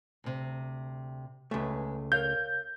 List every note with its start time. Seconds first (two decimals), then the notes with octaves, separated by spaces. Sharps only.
0.24 D2 C3
1.51 C#2 G#3 A3 B4
2.12 A#4 C#5 F5 G6